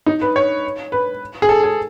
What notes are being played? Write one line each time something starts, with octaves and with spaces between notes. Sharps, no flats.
D#4
B4
C#5
B4
G#4
A4
G#4